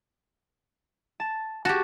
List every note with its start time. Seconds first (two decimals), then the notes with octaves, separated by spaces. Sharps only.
1.20 A5
1.65 F#4 G4 A5